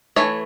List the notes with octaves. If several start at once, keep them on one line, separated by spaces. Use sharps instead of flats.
E3 A3 C#5